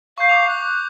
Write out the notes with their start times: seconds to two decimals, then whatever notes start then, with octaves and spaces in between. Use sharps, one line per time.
0.18 F5 C#6 G6
0.29 C#6 D6 F7
0.47 F#6
0.60 D6